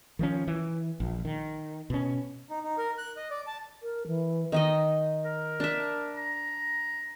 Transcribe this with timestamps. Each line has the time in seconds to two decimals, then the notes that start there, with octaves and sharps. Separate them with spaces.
0.19 D#3 F3 C#4
0.47 E3
1.00 A#1
1.25 D#3
1.90 B2 C#4
2.50 D#4
2.63 D#4
2.78 A#4
2.98 F#6
3.17 D#5
3.31 D5
3.47 A5
3.83 A#4
4.07 E3
4.52 D#3 D#4 D#5
5.24 A#4
5.60 D4 E5
6.16 A#5